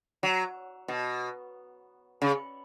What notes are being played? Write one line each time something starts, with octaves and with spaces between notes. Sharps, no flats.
F#3
B2
C#3